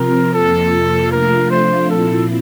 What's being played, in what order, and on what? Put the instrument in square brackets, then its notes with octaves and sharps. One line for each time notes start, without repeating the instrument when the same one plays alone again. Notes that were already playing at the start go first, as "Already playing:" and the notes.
Already playing: [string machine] C3 F3 C4 F4 [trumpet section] A#4
[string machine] F2 C3 F3 A#3 F4 [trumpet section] A4
[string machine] C3 F3 A3 D4 F4 [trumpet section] A#4
[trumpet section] C5
[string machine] A#2 F3 C4 E4 [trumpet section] A4